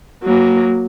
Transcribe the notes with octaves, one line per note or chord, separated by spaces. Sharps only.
F#3 A#3